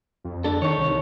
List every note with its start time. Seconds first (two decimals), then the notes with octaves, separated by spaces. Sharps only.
0.24 F2
0.44 D4 A4
0.62 D#3 D#4 C#5
0.78 C2